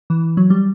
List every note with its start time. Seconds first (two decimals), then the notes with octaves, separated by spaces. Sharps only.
0.10 E3
0.37 F#3
0.50 G3